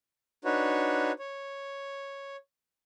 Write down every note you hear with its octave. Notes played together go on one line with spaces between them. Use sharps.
D4 D#4 F#4 B4 C#5
C#5